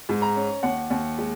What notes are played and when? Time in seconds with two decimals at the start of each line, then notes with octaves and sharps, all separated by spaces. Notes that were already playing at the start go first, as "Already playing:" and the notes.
0.09 G#2
0.22 A#5
0.36 C#4
0.63 D#2 F#5
0.90 D#2
1.18 G#3